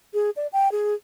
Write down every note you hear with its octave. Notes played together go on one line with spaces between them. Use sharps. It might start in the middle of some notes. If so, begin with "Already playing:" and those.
G#4
D5
G5
G#4